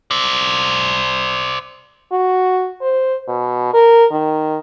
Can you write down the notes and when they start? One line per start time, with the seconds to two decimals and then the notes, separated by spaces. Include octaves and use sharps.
0.11 C5 D5
2.12 F#4
2.81 C5
3.28 B2
3.73 A#4
4.11 D#3